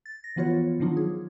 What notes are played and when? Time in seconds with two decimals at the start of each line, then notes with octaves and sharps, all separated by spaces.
0.06 A6
0.24 A#6
0.36 E3 F3 B3 F4 F#4 C#5
0.80 D#3 F3 F#3 D4 D#4 F4
0.97 G#4